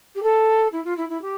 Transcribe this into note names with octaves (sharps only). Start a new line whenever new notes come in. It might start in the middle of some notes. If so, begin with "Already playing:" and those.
G4
A4
E4
F4
E4
E4
G4